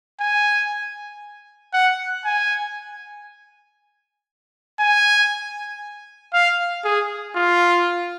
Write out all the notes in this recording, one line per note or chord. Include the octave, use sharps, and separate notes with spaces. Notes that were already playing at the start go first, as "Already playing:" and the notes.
G#5
F#5
G#5
G#5
F5
G#4
F4